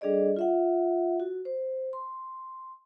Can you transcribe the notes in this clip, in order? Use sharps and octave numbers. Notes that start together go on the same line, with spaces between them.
G3 D4 G#4 A4 D5 D#5
F4 E5 F#5
F#4
C5
C6